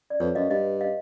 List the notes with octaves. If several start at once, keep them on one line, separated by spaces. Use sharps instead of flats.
D5
F2 B4 C#5
F#2 D#5 F5
G2 D#5 F5
D#5 F5